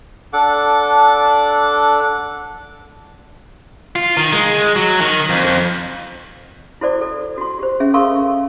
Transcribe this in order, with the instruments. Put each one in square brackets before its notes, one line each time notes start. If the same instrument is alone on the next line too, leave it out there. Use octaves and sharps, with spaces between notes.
[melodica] D4 A4 F#5 D6
[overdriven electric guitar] F4
D#3
G#3
F#3
D#3
F2
F2
[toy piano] E4 F#4 A4 C5 D5 D6
A4
F#4 C6
G4 C5
C#4 G#4 E5
A4 A#4 F5 C6 C#6